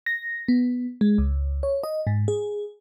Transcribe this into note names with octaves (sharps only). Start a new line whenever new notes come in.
A#6
B3
G#3
C#2
C#5
D#5
G#2
G#4